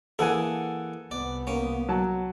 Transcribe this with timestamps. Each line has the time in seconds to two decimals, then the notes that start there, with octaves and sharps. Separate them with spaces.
0.19 E3 A#3 G#4 A4 F#5 G#5
1.11 C2 B3 D5
1.47 A#3 C#4
1.89 F#3 A5